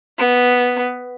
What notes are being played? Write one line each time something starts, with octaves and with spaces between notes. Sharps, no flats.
B3